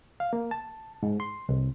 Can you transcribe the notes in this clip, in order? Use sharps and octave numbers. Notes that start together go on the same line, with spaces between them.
F5
A#3
A5
G#2
C6
C2